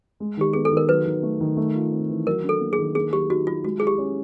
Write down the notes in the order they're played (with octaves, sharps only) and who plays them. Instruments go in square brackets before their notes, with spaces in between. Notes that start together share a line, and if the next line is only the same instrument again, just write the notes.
[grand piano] G#3
[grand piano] D#3 [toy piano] G4
[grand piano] B3 [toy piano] G#4
[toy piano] A4
[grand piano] D#3
[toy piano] A#4
[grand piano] F#3 [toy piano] B4
[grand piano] D#3
A3
D#3
A3
F4
C4
E3
[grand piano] F#3 [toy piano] A#4
[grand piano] D4
[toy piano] A4
[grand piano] A#3
[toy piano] G#4
[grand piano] D#3
[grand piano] A#3 [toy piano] G#4
[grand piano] F#3 [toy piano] G4
[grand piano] D#4 [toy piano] F#4
[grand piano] F#3 [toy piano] F4
[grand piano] G#3 [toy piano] F#4
[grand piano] E4 [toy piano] G#4
[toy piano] G4
[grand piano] C#4